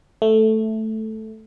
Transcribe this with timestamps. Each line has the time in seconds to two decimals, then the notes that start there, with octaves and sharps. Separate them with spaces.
0.22 A3